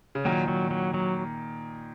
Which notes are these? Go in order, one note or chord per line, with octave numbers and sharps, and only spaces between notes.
C#3
A#2 D#3 F#3
F#3
F#3
F#3